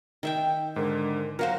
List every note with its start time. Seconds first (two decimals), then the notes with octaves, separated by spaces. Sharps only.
0.23 D#3 E5 G5
0.76 G#2 D3 A#4
1.39 F#3 F#4 A#4 C5 F5